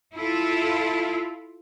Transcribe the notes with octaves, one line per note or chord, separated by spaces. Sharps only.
E4 F4 A4